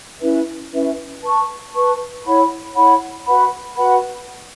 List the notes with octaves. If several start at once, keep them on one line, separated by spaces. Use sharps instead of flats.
C#4 E4 B4 E5
C#4 E4 B4 E5
B4 A5 C#6
B4 A5 C#6
E4 C#5 F#5 B5
E4 C#5 F#5 B5
F#4 B4 F#5 B5
F#4 B4 F#5 B5